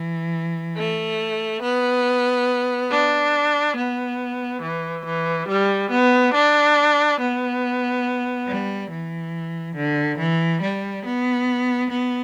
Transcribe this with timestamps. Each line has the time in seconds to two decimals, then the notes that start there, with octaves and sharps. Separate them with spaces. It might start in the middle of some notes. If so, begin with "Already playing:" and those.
Already playing: E3
0.75 A3
1.61 B3
2.90 D4
3.75 B3
4.61 E3
5.04 E3
5.47 G3
5.90 B3
6.33 D4
7.19 B3
8.47 G3
8.90 E3
9.76 D3
10.18 E3
10.62 G3
11.05 B3
11.90 B3